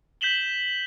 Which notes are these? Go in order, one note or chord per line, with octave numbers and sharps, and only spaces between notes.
G6 B6 E7 F#7 G7